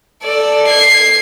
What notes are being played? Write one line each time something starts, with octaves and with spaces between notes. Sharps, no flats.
A4 D5
G#6 C7